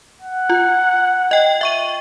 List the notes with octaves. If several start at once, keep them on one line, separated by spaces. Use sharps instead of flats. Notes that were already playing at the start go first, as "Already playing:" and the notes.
F#5
F4
D#5 G5
E5 C#6 D#7